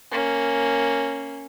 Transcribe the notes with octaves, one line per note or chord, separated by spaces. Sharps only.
A#3 C#4